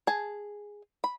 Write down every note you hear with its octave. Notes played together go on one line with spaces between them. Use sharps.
G#4 A5
B5